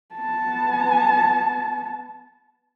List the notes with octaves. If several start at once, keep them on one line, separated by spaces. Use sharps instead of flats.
B3 A5